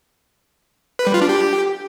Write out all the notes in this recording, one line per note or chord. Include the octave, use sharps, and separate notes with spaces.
B4
G3
F4
D4
G4